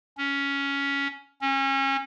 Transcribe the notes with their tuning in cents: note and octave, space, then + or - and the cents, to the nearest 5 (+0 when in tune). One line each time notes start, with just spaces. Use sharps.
C#4 +10
C#4 -30